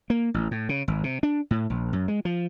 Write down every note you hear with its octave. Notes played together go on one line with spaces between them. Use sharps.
A#3
A1
A2
C#3
G#1
C3
D4
A2
A#1
F#2
G#3
F3